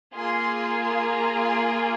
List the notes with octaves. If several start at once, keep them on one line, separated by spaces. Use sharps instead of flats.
A#3 F4 G#4 C6
C6
A#5
C6